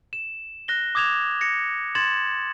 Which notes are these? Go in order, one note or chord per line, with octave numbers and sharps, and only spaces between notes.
E7
F#6 A#6 G7
D6 D#6 G#6 E7 F7
A#6 C#7
C6 G#6 A6 E7 F#7